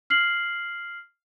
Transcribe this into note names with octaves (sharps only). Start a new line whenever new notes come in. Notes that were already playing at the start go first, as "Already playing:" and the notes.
F6 C7 F#7